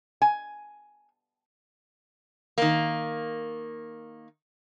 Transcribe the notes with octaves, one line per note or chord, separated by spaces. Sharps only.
G#5
D#3 A#3